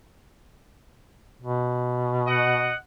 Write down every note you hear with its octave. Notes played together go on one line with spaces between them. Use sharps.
B2
D#5 F#5